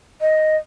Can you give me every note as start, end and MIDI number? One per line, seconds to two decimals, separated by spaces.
0.21 0.57 75